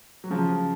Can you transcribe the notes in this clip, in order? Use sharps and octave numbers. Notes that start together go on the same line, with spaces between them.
F#3
C#3 F3